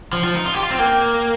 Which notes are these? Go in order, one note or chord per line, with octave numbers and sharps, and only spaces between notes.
F3
F3
D#4
F4
G4
F4
C4
A#3 G5